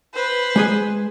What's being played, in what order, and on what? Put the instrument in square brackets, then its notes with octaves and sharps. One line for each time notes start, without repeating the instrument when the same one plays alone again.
[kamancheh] B4 C5
[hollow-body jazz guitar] G#3 G#4 G#5